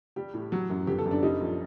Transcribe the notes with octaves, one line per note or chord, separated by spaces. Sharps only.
G3 G4
A2
F#3
F#2
G1 G4
A4
F#2
D4
G3 D#4
A#1